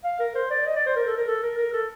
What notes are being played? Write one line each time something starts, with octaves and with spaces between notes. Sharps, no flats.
F5
A#4
C5
D5
D#5
D5
C5
A#4
A4
A#4
A4
A#4
A#4
A4